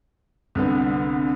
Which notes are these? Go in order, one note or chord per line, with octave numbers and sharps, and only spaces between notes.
C2 D3 B3